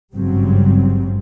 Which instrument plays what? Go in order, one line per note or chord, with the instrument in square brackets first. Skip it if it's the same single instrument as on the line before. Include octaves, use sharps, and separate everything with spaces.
[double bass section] G#1 G2 C#3 F#3 G3 C4